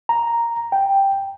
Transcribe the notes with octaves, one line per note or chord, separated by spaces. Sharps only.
A#5
G5